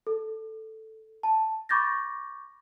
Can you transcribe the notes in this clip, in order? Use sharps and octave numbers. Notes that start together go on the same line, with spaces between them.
A4
A5
B5 C#6 D6 G6 A6 A#6